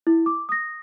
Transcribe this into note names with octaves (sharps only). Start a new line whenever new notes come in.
E4
D6
D#6 A#6